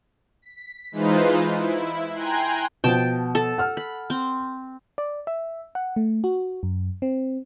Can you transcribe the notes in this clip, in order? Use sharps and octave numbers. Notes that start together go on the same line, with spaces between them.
B6
E3 G#3 D#4 F4 B4 C5
E4
G5 G#5 A#5 C6 F#6 G#6
B2 F3 G5 A5
A4
F#5 F6
B5
C4
D5
E5
F#5
A3
F#4
F#2
C4